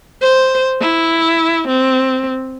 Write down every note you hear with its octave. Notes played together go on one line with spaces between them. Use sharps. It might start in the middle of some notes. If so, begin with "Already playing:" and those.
C5
E4
C4